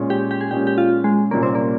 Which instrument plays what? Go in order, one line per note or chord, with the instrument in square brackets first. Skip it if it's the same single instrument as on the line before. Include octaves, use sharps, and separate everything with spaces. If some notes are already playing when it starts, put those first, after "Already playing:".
Already playing: [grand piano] A#2 G#3 C#4
[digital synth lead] G4
G4
G#4
[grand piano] A#2 G#3 C#4 [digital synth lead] G4
[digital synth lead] G4
F4
G#3
[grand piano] C2 A#2 G3 C#4 [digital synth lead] A#3
[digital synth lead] C4
A#3